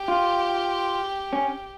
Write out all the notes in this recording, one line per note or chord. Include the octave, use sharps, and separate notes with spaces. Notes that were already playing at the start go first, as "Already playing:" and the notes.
Already playing: G4
F4
C#4